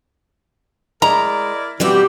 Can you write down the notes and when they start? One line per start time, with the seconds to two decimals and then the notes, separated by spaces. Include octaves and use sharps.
1.02 G#3 E4 A#4 D5 A#5
1.80 B2 E3 G3 C4 F#4 G4